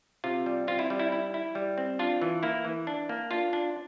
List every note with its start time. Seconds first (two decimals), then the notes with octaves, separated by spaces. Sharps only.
0.24 C3 F4
0.46 G3
0.67 C4 F4
0.79 E4
0.90 G3
0.99 E4
1.12 E4
1.34 E4
1.55 G3
1.78 C4
1.99 D4 F4
2.22 E3
2.43 A#3 E4
2.65 E3
2.87 D4
3.09 A#3
3.31 D4 F4
3.53 D4